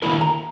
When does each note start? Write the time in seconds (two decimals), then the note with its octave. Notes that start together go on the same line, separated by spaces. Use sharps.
0.02 D#3 A#3 E4 A#4 B5
0.21 A#5